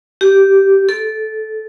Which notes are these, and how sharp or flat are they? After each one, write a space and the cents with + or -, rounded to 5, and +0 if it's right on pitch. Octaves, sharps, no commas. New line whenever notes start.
G4 -10
A4 -15